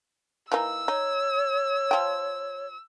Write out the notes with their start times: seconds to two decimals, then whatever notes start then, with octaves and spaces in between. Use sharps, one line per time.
0.52 E3 A#3 D#4 E6
0.88 D#4 C#5
1.91 F3 G5